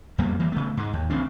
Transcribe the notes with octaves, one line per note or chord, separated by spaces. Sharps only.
F2 G3 A#3 B3
E3 G3 A#3
C#3 A3 B3
G#2 G#3
D#2
A1 C#3 C4 D4